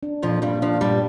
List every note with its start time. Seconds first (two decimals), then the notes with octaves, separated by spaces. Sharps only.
0.03 D4
0.22 F2 A#2 F3
0.42 G2 G3 D4
0.62 F2 F3 D4
0.81 G2 A#2 G3